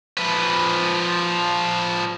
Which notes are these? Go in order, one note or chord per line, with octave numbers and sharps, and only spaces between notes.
F3 B4